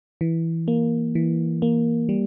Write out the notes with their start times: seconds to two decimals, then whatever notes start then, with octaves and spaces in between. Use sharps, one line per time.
0.21 E3
0.68 A#3
1.15 E3
1.62 A#3
2.09 G3